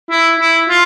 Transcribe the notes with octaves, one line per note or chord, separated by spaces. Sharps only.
E4
E4
F4